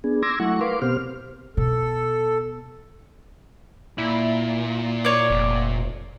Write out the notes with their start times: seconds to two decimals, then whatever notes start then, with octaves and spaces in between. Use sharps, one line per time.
0.04 B3 D4 G#4
0.23 C6 D6 E6 G#6 A#6
0.40 F#3 A3 E4 F#5 C#6
0.61 A#4 B4 F5 C6 D6
0.82 B2 B3 C4 G4 C5 F6
1.57 B2 A4
3.98 A#2 E4
5.05 C#5 D5
5.30 F1